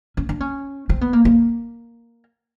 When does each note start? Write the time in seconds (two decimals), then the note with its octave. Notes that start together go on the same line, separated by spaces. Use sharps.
0.17 C#4
0.29 D4
0.40 C#4
0.89 C4
1.01 B3
1.13 A#3
1.25 A#3